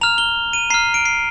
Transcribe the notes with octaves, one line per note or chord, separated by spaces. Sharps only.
A#5 F6 F7
G7
D#7
A#5 F6 C7
D7
C7